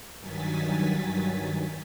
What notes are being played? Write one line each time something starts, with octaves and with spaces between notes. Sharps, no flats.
G2 D#3 F#3 G#5 A6 B6